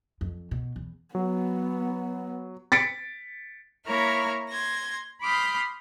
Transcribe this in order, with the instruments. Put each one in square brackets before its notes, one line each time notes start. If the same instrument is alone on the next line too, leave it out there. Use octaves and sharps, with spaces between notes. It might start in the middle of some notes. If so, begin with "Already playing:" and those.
[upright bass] F2
B2
E2
[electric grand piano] F#3 [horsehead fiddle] B3
[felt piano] A6 B6 C#7 D7
[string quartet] A#3 E4 C#5 A#5 F6
C6 G#6 A#6
B5 C6 D6 D#6 F6 G6